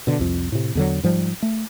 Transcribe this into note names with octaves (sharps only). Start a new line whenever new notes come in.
B2 D3
C2 F2
A2 C3
E2 D3 F#3
G#2 F3 G3
A3